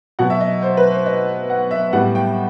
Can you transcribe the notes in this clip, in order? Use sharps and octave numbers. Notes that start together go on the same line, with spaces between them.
B2 F#3 B3 F#5
E5
D#5
C5
B4
C5
D#5
F#5
E5
A2 G3 B3 F#5
G5